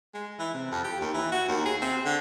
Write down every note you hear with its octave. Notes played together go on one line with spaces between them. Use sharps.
G#3
E3
C3
F2
G4
D#2
E3
F#4
D#2
G#4
C4
D3